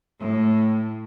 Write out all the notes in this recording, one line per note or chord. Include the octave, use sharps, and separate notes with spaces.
A2